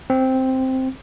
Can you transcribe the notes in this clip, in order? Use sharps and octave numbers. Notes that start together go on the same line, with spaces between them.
C4